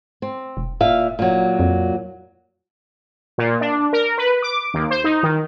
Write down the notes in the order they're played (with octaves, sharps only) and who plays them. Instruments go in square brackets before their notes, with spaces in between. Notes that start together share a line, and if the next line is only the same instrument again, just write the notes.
[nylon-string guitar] C4
[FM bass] E1
[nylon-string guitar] A#2 E5 F5
A#2 F#3
[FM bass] F2
[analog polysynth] A#2
D4
A#4
B4
D6
D#2
C5
D#4
D#3